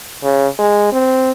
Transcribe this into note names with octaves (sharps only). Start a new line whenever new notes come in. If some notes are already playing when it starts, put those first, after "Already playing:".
C#3
G#3
C4